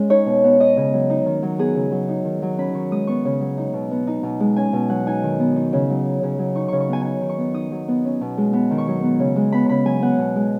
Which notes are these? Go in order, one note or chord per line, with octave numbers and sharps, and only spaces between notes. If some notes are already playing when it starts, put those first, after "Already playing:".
Already playing: G#3 C#4
D#4 C#5
B2
B3
D#4 D#5
C#3
F#3
D#4
D#3
F#3
B3 G#4
C#3
F#3
D#4
D#3
F#3
C#4 B5
D#3 C#6
G#3 D#6
B3 C#6
C#3
F#3
D#4
B2
B3
D#4
B2
G#3
C#4 G#5
B2
F#3 F#5
D#4 G#5
D#3
B3
D#4
C#3
F#3
D#4
C#3
F#3
D#4 C#6
C#3 C#6
C#6
B3 G#5
D#4 G#5
D#3
C#6
B3
D#4 D#6
F#3
B3
C#4
B2
G#3
B3
D#3
C#6
F#3
B3
C#3
G#3
B3 B5
C#3 B5
F#3 G#5
B3 F#5
B2
G#3